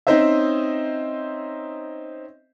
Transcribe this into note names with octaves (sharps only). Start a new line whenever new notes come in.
C4 C#4 D#4 C5 D#5 E5